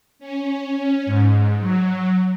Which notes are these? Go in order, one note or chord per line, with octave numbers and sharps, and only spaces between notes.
C#4
G#2
F#3